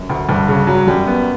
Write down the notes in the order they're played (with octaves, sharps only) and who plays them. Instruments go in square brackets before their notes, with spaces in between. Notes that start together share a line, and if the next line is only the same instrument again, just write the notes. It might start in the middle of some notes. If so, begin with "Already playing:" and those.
Already playing: [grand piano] F#2
[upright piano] D2
[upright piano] D2 [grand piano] G2
[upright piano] C#3
F#3
[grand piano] F#2 [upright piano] G3
[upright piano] B3